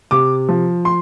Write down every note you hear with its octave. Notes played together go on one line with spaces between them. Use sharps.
C3 D6
F3
C6